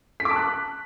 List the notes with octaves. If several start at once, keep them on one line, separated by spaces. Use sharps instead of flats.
B6
D6
A5
F#6